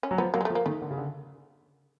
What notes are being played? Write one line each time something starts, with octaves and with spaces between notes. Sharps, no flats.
C#4
F#3
F3 B3
F#3 A#3
G#3
A3
F3
A#3
D#3 A3
D3
C#3
D3